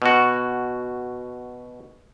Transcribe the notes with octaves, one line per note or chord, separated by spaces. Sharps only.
B2 F#4